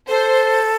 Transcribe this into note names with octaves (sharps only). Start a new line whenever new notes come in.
A4 C5